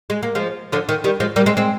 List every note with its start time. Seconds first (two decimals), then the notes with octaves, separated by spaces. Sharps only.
0.10 G#3
0.23 A#3
0.35 F3 G#3
0.72 D3 F3
0.89 D#3
1.04 D#3 G3
1.20 F3 G#3
1.36 G3 A#3
1.46 G#3 C4
1.57 G#3 C4